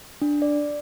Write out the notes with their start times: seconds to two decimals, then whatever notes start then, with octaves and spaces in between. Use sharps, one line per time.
0.22 D4
0.42 D5